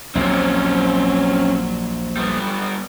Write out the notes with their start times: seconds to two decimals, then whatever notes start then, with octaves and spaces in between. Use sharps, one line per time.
0.15 A#1 D#2 A#2 F#3 C4 C#4
2.17 G3 B3